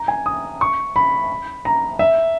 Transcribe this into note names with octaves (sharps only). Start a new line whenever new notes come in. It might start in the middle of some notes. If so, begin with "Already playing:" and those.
Already playing: A#5
G#5
D#6
C#6
B5
A#5
E5